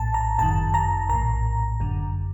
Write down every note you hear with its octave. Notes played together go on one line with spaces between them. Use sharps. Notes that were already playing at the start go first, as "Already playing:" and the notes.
Already playing: A#1 A2 A5
A#5
G1 F#2 D#3 A5
A#5
A#1 A2 A#5
G1 F#2 D3